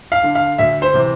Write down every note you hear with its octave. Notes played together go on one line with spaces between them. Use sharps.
F5
D3
F5
D2 E5
C5
C3 E3